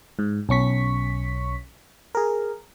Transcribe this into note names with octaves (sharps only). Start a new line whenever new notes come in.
G#2
B1 C#4 C#6 B6
G#4 A#4